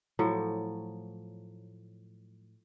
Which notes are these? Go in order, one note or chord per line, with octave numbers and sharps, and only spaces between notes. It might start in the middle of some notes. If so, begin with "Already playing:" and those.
A2 F3 F#3